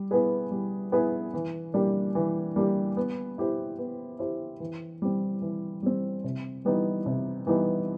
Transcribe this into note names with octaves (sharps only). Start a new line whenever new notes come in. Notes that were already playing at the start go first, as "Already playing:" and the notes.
Already playing: G3
B3 E4 G#4 B4
G3
B3 E4 G#4 B4
E3
G3 A#3 D4 G4
E3
G3 A#3 D4 G4
B3
E4 G4 C5
B3
E4 G4 C5
E3
G3 C4
E3
G3 C4
C3
E3 G3 B3 D#4
C3
E3 G3 B3 D#4